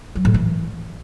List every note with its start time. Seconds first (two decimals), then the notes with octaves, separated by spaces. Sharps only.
0.15 F#3
0.25 A2
0.34 E3